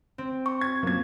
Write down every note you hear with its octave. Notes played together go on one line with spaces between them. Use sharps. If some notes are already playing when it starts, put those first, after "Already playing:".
C4
C#6
G#6
F#2 B2 F3 A#3 G#6